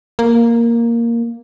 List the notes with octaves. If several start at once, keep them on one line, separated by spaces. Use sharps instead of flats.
A#3